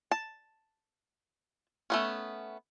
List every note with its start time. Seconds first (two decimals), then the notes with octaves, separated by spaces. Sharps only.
0.11 A5
1.90 A3 B3 C#4